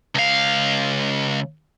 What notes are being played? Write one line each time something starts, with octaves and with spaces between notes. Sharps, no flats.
C#2 F5